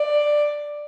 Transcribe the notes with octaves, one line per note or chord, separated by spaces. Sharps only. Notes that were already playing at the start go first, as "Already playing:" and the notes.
Already playing: D5